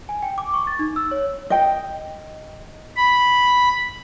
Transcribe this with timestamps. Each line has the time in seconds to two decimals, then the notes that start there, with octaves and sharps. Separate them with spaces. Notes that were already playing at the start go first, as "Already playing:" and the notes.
0.09 G#5
0.23 G5
0.38 D6
0.54 C#6
0.67 A6
0.79 D#4
0.96 E6
1.11 C#5
1.50 D#5 G5
2.97 B5